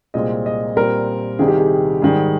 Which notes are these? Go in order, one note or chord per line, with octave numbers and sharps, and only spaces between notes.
C2 A#2 G#3 C4 D#5
D#5
A#2 G3 C4 A#4
C2 C3 D#3 G#4
G4
G#4
G#2 D#3 G3 G#4